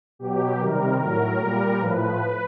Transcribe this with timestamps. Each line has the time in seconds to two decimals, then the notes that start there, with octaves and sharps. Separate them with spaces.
0.19 B2 F#3 G4
0.59 C3 D#3 G3 A#4
0.99 A2 F#3 A#4
1.39 A#2 G3
1.79 A2 F3 B4